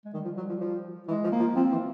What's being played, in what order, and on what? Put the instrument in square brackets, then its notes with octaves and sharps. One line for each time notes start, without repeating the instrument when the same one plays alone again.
[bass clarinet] G#3
[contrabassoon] D#3 [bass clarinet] G3
[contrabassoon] F3
F#3
F3
F3
[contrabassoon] E3 [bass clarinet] G#3
[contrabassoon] F3
[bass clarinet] A#3
[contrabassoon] F3
[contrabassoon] F3 [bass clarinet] C4
[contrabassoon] E3